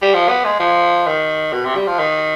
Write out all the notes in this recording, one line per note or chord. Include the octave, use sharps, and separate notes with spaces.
G3
F3
B3
G#3
F3
D#3
B2
C3
G3
F3
D#3